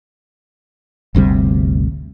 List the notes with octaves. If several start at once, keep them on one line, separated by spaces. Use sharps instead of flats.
G1 D2 C3 G3